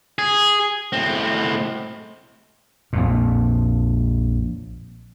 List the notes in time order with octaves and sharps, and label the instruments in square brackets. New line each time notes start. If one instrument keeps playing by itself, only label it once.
[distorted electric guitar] G#4
[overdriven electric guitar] A2 C4
[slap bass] A#1 F2 A#2